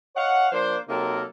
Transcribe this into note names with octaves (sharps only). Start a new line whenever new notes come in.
C#5 D#5 F5 F#5
F3 A#3 D4 C5
C3 F#3 A#3 D#4 A4 A#4